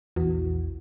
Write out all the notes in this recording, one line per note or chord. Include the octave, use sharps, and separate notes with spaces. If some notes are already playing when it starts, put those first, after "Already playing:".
A#1 E2 E3 F#4